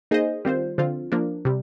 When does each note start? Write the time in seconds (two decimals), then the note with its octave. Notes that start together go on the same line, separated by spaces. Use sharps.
0.11 A#3 D#4 G#4 C5 D#5
0.45 D#3 G3 C4 F4 C5
0.78 D3 F3 C4 F4
1.12 F3 A#3 D4
1.45 C3 G3